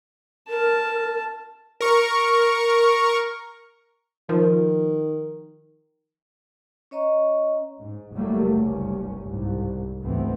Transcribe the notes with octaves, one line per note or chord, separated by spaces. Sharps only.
A#4 A5
A#4 C#6
D#3 F3 A#4
C#4 C#5 D#5 A#5 C#6
G#2
F#1 F#3 G3 A3 A#3
F#1 C2 G2 C#4
C2 G#2
D2 G#2 E3 B3 C4